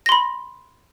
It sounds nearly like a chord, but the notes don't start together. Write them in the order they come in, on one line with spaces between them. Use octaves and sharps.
A#6 C6 B5